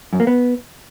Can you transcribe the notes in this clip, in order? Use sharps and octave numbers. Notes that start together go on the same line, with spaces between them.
F#2
A#3
B3